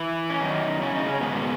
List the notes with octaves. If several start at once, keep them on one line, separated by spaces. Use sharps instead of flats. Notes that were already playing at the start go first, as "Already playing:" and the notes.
Already playing: E3 E4
C#4
F#2 D#3 D#4
C#3 C#4
D#4
C#4
G#2 B2 D#3 G#3 B3